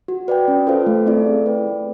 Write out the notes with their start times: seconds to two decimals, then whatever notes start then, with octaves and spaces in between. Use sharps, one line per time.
0.08 F#4
0.28 B4 D5 G5
0.48 C#4
0.67 F4 A4 C5 F5
0.86 A3
1.06 C4 E4 A4 D5
1.26 G#4
1.46 B4 D5 G5
1.67 A3